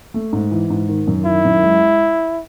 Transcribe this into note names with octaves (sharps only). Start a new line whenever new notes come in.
A3
G#2
E3
G#2
D#3
F#2
D#3 E4
F#2
G#3